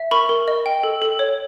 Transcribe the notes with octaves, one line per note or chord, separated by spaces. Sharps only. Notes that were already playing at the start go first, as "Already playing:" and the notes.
Already playing: E5
A#4 B5 C#6
A#4
D#5
G5
A4
A4
C#5